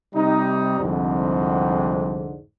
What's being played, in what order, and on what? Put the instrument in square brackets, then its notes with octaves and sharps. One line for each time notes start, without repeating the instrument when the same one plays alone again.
[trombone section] C3 G3 D#4
C2 F2 G#2 D3